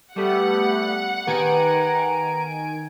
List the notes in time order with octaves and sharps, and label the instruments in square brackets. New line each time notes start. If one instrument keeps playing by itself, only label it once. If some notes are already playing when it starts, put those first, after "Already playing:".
[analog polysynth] G3 A3 B3 [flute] G4 [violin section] F#5
[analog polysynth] D#3 G#5 D7 [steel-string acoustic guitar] B3 G4 G5 [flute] A#5